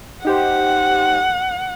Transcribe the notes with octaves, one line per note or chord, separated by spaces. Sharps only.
D#4 G4 C5 F#5